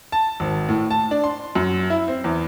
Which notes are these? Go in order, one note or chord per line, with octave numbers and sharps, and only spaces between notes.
A5
G#1
A2
A5
D4
C6
F#2
E4
C4
E2